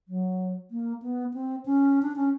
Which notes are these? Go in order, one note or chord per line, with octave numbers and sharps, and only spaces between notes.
F#3
A#3
B3
C4
C#4
D4
C#4